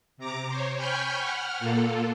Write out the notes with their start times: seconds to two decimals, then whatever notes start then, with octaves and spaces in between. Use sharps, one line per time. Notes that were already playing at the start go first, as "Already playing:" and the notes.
0.18 C3 A#5 D6
0.48 C5 C#5
0.76 G5 G#5 B5 C#6 F6 G6
1.20 F#5 F6
1.60 A#2 A#3 F4 A4